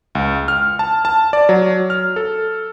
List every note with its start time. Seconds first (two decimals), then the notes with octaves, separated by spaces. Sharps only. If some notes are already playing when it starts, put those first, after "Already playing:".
0.15 C#2
0.48 F6
0.79 A5
1.05 A5
1.33 D5
1.49 F#3
1.90 F6
2.16 A4